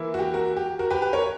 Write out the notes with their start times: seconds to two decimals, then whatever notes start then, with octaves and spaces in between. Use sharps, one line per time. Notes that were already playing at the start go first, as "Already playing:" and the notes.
Already playing: E3 A#3 E4
0.14 F#4
0.19 G4
0.34 F#4 A#4
0.57 G4
0.79 F#4 A#4
0.91 G4 B4
1.02 G4 B4
1.13 A#4 C#5